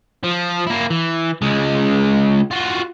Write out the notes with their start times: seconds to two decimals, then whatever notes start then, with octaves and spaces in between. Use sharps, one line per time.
0.23 F3
0.67 A#3 E4
0.90 E3
1.42 C#2 G#3
2.51 F4 F#4